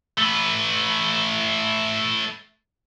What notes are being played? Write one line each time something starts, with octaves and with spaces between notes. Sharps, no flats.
A3 B4